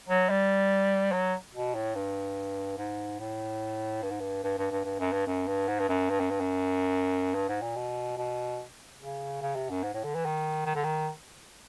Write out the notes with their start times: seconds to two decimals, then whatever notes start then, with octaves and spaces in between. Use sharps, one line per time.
0.09 F#3
0.30 G3
1.12 F#3
1.54 B2
1.74 A2
1.95 G2
2.78 G#2
3.20 A2
4.03 G2
4.11 G#2
4.20 G2
4.44 G2
4.58 G2
4.71 G2
4.85 G2
4.99 F#2
5.13 G2
5.27 F#2
5.48 G2
5.68 G#2
5.79 G2
5.89 F#2
6.10 G2
6.20 F#2
6.30 G2
6.40 F#2
7.35 G2
7.49 G#2
7.62 A#2
7.76 B2
8.18 B2
9.00 C#3
9.42 C#3
9.56 C3
9.70 F#2
9.83 G#2
9.94 A2
10.04 D3
10.15 E3
10.25 D#3
10.66 D#3
10.75 D3
10.84 D#3